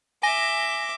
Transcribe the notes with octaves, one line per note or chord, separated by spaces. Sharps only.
E5 G#5 D6 A#6 G7